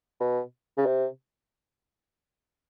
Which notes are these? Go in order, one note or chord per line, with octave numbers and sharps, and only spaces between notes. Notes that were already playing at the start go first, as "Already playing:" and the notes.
B2
C#3
C3